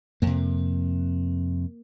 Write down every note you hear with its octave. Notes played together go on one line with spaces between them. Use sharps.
F2 C3 A#3